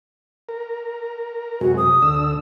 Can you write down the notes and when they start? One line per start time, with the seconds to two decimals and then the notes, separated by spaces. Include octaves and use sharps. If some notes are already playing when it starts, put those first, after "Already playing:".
0.49 A#4
1.61 F#2 C3 G#3 F#4
1.77 D#6
2.02 D2 D3 E6